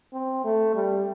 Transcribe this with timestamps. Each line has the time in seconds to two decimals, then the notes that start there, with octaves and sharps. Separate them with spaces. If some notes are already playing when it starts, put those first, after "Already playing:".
0.13 C4
0.44 A3
0.75 G3